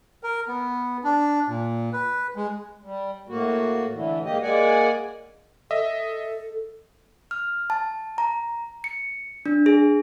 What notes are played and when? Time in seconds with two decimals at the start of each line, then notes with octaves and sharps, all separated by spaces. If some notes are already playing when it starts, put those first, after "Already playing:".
0.23 A#4
0.48 B3
1.04 D4
1.48 A#2
1.93 B4
2.36 G#3
2.83 G3
3.29 A2 A#3 F#4
3.93 A2 D3 E3
4.25 G#2 A#3 G4 D#5
4.42 G#3 A#3 D5 F#5 G#5
5.71 A4 D#5 E5
7.31 F6
7.70 A5
8.18 A#5
8.84 C#7
9.46 D4
9.66 G#4